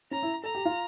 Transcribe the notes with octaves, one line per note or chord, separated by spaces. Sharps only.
C#4 A#5
E4
A4 A#5
G4
F4